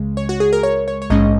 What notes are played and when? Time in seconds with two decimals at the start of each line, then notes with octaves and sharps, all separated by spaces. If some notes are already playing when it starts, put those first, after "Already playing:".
Already playing: C#2 C#3 G#3
0.17 C#5
0.29 F#4
0.40 G#4
0.53 A#4
0.63 C#5
0.88 C#5
1.02 C#5
1.10 A#1 G#2 G#3 C#4 D#5